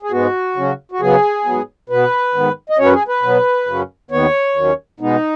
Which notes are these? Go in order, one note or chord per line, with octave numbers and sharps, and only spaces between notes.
G#4
G#2 G#3 B3 F#4
C#3 F#3 C#4
F#4
C#3 F#3 B3 G#4
G#2 F#3 B3
B2 B3 B4
G#2 D#3 B3
D#5
F#2 F#3 C#4 C#5
B4
G#4
B4
B2 F#3 B3
F#2 C#3 F#3 C#4
D#2 D#3 B3 C#5
D#2 D#3 F#3 C#4
B2 G#3 B3 D#4